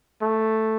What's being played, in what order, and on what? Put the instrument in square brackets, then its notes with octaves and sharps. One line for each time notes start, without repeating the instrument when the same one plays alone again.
[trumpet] A3